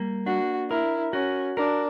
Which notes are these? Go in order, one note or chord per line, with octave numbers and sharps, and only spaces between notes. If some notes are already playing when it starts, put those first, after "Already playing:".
Already playing: G3 A#3
D4 F#4
E4 A#4
C#4 F#4
D4 A#4